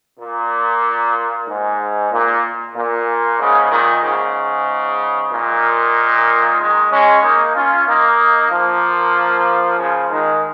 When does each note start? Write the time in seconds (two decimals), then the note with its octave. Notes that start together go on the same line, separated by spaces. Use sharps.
0.20 A#2
1.47 G#2
2.12 A#2
2.75 A#2
3.39 G#2 C#3
3.71 A#2 D#3
4.03 G#2 C#3
5.31 A#2 D#3
6.58 D#3 G#3
6.90 G#3 C#4
7.22 A#3 D#4
7.55 C#4 F4
7.87 A#3 D#4
8.50 F3 A#3
9.78 C#3 F3
10.10 D#3 G#3